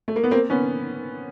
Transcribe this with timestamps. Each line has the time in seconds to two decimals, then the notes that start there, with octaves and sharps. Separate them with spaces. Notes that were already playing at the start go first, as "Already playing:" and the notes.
0.08 A3
0.16 A#3
0.23 B3
0.31 A#3 C4
0.50 B3 C#4